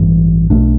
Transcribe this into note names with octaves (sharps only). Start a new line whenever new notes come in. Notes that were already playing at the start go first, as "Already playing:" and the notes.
Already playing: A1 G2 E3
B1 B2 A3 D4